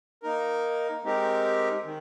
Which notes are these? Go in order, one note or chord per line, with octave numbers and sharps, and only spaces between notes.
A#3 D#4 A#4
G#3 C4 D#4 G4 A#4
D#3